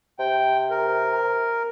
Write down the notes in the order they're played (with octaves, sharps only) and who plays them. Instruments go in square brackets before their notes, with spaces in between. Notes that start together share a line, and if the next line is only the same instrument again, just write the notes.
[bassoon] C3 [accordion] G5
[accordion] A#4